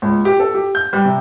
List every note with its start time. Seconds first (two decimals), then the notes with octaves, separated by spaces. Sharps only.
0.02 C#2
0.25 G4
0.40 A4
0.54 G4
0.75 G6
0.93 G3
1.05 C3